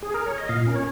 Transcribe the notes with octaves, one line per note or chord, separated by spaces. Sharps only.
G#4
A#4
C#5
D#5
A#2 F5
C#4 A#4
C#5